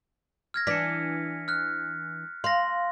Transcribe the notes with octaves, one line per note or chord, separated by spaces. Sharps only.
F6 G#6 A#6
E3 D4 B6 C#7
F6 F#6
F5 C6 A#6